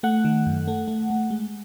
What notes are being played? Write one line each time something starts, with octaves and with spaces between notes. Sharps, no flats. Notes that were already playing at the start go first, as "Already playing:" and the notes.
A3 F#5
D#3
F#2
A3
A3
A3
G#3